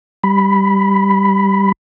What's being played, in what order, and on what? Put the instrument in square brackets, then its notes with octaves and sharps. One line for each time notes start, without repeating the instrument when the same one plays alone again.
[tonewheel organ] G3 B5